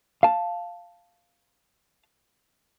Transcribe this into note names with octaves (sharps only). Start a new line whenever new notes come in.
F5 A5